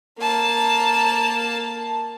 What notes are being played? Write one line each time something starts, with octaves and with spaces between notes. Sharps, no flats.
A#3 A5